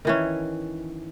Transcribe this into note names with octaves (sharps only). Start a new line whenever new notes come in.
D#3 E3 C#4